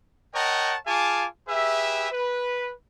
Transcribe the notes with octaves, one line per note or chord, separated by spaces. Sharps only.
A#4 C#5 D#5 F#5 G5 A5
F4 G#4 F5 G#5 A5 D6
G4 G#4 B4 E5
B4